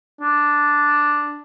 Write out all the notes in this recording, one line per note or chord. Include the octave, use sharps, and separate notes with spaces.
D4